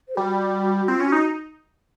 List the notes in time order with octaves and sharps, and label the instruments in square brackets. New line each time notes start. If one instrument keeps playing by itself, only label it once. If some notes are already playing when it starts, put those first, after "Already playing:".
[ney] C5
[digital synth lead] G3 [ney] F#4
[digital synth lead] C4 [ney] F4
[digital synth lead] C#4
[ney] F#4
[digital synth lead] D#4